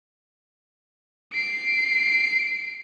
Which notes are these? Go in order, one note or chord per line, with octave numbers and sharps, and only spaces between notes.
C7 D7